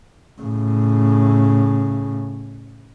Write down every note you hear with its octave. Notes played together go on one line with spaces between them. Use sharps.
A2 C#3